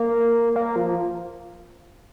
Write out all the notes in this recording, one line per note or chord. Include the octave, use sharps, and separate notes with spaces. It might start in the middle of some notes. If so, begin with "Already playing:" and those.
Already playing: A#3
A#3
F3